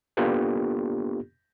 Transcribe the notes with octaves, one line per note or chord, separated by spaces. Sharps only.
A#3 B3 D4 F4 G4 A4